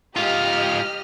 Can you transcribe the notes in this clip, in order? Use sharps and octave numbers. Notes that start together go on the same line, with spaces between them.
G#2 F4 G4 D#5 F6